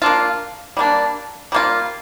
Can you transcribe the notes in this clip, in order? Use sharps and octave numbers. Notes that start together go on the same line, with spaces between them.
A#3 D4 F4
G3 A#3 D4
G3 A#3 F4